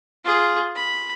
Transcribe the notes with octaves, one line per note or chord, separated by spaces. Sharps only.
F4 G#4
B5